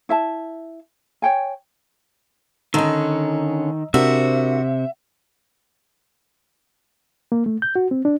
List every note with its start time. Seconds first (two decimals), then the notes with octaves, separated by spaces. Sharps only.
0.09 E4 E5 A5
1.22 C#5 G5 G#5
2.74 D3 D#3 C#4 D#5 A#5 E6
3.94 C3 D4 F#4 A#4 C5 E5
7.32 A#3
7.46 A3
7.62 G6
7.76 F#4
7.91 C4
8.05 D4